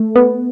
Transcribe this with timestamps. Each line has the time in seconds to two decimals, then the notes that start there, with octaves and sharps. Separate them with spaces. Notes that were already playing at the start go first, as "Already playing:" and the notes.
Already playing: A3
0.16 B3